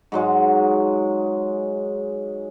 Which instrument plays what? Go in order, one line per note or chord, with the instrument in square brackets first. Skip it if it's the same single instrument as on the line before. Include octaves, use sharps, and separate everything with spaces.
[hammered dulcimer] G#2 F#3 G#3